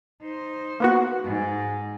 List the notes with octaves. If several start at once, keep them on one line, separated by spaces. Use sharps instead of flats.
D#4 C5
A#3 B3 F#4
G#2